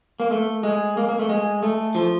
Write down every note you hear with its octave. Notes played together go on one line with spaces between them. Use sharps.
A#3
A3
G#3
A#3
A#3
A3
G#3
A3
F3